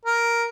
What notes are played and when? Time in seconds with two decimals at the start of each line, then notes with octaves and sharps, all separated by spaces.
0.05 A#4